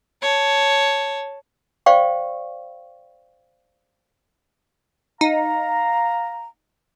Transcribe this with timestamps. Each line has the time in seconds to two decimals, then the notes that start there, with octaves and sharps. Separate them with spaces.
0.22 C#5 A5
1.86 C5 D5 F5 G5 C#6
5.21 D#4 F5 A#5